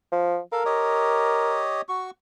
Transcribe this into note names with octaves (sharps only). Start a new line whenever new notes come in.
F3
A4 A#4 F5
G4 C#5 D#5
F#4 C#6